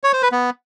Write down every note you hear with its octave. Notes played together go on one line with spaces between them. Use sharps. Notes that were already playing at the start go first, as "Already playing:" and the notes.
C#5
C5
B4
B3